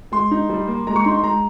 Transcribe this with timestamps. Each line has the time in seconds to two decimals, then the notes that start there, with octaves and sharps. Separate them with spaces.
0.12 G#3 C6
0.31 D#4
0.50 G3
0.68 A#3
0.87 G#3 A#5
0.96 C#6
1.04 D#4 C6
1.15 C6
1.23 G#3 A#5